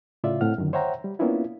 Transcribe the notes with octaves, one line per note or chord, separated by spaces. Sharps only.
A2 C#3 F4 D5 E5
A2 C4 F#5 F6
F#2 D3 D#3
C5 C#5 E5 F#5 G5 A#5
G3
A#3 B3 C#4 D4 E4 F4